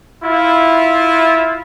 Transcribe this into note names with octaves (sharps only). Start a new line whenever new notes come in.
E4 F4